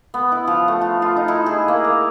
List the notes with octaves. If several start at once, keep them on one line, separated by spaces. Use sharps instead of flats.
B3
E4
F3
A3
F4
F4
D#4
E4
G#4
A#3
A#5